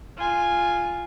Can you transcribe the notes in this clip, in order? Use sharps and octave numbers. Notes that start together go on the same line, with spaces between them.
F4 G#5